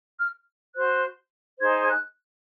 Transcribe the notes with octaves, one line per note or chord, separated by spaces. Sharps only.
F6
F#4 C5 F#6
D#4 G#4 C5 G#6
G#6
F#6